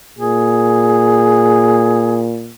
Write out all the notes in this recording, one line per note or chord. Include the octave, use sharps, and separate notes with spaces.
A#2 G#4